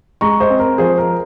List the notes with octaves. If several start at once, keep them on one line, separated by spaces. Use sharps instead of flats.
G#3 A#5 C#6
C5 D#5
C4
A#4
F3 G#4 C5
A#4